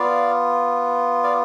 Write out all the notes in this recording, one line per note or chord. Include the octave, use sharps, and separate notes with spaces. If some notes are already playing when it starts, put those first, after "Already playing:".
Already playing: B3 F4 D5 F5
D5 F5